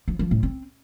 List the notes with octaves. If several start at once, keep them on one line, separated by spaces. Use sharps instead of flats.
F3
F3
A2
C4